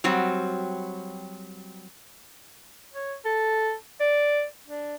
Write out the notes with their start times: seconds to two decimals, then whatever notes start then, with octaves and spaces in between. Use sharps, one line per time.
0.04 F#3 G3 C4 F#4
2.94 C#5
3.25 A4
4.00 D5
4.68 D4